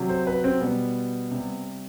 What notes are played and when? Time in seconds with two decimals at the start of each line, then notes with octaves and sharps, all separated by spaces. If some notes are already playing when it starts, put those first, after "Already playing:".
Already playing: C3 F#3
0.09 C5
0.27 B4
0.44 C4
0.61 B2 G3 B3
1.31 C3 G3